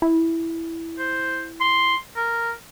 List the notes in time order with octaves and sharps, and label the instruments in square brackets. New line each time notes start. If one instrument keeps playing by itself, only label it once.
[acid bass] E4
[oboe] C5
C6
A#4